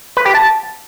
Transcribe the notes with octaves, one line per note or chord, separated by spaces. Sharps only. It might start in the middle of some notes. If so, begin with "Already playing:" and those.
B4
G4
A5